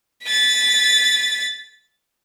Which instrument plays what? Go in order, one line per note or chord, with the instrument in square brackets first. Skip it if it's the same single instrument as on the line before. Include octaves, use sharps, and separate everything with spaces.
[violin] A6 B6